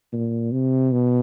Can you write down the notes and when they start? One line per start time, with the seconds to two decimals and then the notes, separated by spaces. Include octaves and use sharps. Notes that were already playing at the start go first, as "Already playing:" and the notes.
0.13 A#2
0.52 C3
0.92 B2